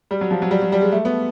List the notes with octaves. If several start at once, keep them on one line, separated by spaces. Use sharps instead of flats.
G3
F#3
F3
F#3
G3
F#3
G3
G#3
A3
B3